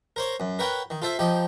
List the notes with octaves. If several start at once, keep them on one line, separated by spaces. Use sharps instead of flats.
A#4 C5 C#5
F#2
A#4 B4 C#5 F#5 G5
D#3
F4 A4 C5 E5
F3 D#4 G4